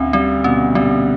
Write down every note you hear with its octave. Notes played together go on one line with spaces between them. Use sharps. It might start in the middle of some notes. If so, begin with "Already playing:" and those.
Already playing: D2 C4 C#4
G3 C4
B2 C#4
G3 C4